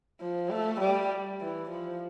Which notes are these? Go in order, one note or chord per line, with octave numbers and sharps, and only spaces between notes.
F3
A3
G3
E3
F3